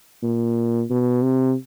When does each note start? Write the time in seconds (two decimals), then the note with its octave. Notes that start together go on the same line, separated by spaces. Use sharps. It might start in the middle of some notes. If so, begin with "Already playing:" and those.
0.22 A#2
0.90 B2
1.23 C3